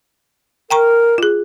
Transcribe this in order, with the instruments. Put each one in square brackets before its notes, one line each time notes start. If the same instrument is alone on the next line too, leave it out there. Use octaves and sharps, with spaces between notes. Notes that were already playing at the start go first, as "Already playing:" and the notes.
[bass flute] A#4 [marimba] G5 A#5 C#6
[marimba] F4 G#4